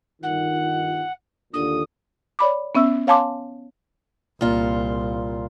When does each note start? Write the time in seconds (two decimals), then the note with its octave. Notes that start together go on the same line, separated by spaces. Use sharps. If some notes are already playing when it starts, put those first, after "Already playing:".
0.22 G1 D#3 F4 F#5
1.53 D#2 A#2 D3 D#6
2.39 C#5 D5 B5 D6
2.75 B3 C#4 E5 E6
3.07 C#5 F5 G#5 A5 C6 D6
4.41 C2 A#2 F4